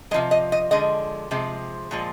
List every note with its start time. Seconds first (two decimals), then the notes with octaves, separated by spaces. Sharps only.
0.11 G#3 D#5
0.14 C3 F3
0.31 D#5
0.52 D#5
0.71 D3 F3 G#3 D#5
1.31 C3 F3 G#3
1.91 A#2 F3 G#3